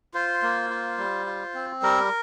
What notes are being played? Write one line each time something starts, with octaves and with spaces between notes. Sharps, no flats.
F4 C5
A#3
F4
G3
F4
C4
G3 A#4